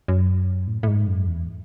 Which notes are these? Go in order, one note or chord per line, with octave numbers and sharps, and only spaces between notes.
F#2
A2
A2
G#2
F#2
E2